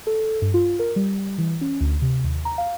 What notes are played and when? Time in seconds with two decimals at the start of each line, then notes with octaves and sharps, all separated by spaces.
0.07 A4
0.42 G2
0.54 F4
0.79 A#4
0.96 G3
1.38 E3
1.61 C#4
1.81 D2
2.02 C3
2.24 D#2
2.45 A#5
2.58 F5